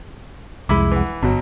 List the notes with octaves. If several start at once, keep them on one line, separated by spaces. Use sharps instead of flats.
C2 F2 G#3 E4 B5 D6
E3 F#5
G1 B2 F#3